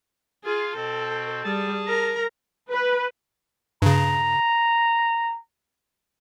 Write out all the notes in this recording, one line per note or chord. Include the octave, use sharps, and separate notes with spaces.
F4 G#4
B2 C4 A4
G3 G#4 A5
A#4 A#5
B4
G2 C#3 A#5